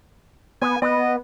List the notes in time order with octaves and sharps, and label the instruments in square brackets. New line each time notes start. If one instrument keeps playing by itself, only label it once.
[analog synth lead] B3 [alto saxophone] G#5
[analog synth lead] B3 [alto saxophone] D#5